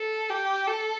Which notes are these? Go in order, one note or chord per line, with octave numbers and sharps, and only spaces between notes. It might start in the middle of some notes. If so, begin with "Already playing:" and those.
Already playing: A4
G4
A4